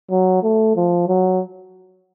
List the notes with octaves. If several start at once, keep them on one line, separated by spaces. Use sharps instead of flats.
F#3
A3
F3
F#3